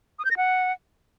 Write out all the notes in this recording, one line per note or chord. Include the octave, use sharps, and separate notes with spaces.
D#6
G6
A#6
F#5